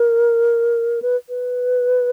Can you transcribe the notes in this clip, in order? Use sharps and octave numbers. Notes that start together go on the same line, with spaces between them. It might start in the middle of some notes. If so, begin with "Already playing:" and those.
Already playing: A#4
B4
B4